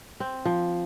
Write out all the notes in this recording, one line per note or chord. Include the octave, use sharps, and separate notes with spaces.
C4
F3